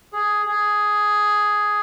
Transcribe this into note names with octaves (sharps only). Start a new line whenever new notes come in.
G#4
G#4